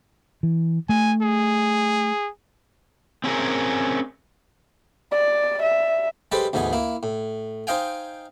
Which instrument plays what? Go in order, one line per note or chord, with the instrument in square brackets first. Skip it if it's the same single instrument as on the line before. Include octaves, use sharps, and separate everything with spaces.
[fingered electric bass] E3
[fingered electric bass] A3 [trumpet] G#5
[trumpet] G#4
[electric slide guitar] C4 C#4 G#4 A#4
[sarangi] D5
E5
[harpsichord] G3 G#3 A4 B4 C5 D5
D2 G#2 E3 B3 G#5
A#3 E4
A2
D#4 C5 D#5 F5 G5 G#5